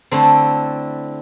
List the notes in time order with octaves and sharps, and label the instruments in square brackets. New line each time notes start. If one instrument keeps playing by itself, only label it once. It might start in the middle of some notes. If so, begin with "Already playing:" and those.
[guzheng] D3 A3 C4 E4